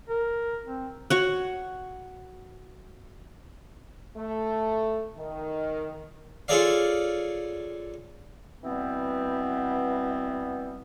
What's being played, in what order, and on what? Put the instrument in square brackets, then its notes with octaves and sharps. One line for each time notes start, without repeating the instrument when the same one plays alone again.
[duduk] A#4
C4
[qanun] F#4 C#5 F#5
[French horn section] A3
D#3
[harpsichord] F4 G#4 A4 C#5 D5 F5
[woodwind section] B2 E3 G3 B3 C4